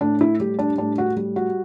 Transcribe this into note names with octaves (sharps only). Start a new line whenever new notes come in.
A2 D4
E4
G3 G4
D4
A2 D4
F#4
G3
F#4